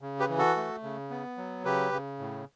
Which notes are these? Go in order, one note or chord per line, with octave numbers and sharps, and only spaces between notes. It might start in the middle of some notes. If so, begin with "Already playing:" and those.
C#3
G4 B4
E3
F#4 A4
A3
C#3
B3
F#3
C#3 G4 B4
C#3
A2